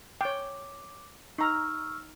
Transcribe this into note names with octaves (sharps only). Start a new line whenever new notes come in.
C#5 G5 D6
D#4 A#5 C#6 E6 F6